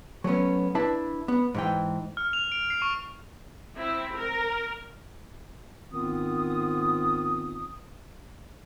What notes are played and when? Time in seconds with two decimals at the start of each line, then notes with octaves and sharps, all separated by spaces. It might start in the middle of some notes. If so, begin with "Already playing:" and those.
0.24 F#3 A3 B3 C#4
0.75 D4 E4 B4 E5 A5
1.28 B3
1.54 G#2 E3 G5
2.17 F6
2.33 F7
2.52 D7
2.70 C7
2.82 C#6
3.77 C4 E4
4.17 A#4
5.91 G#2 D#3 B3 C4 F4 D#6